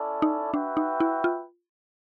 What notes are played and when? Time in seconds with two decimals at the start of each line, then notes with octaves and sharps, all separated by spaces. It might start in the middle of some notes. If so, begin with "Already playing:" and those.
Already playing: C#4 E4 A4 D5
0.22 D#4
0.53 D4 F#4 B4 E5 G5
0.77 D#4
1.00 E4
1.24 F4